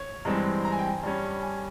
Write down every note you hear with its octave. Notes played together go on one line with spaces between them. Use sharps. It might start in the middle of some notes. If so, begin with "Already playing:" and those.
Already playing: C#5
G2 E3 G#3 C4 A#5
A#5
G#5
G5
G#5
G2 G3 C#4
G#5